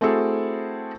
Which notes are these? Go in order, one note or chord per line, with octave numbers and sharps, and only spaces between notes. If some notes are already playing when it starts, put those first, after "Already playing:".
A3 C4 E4 F#4 G#4 A4